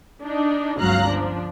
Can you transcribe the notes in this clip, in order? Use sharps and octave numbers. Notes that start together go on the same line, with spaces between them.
D4 D#4
G1 C#2 F#3 F5 A#5 F#6
F3 D4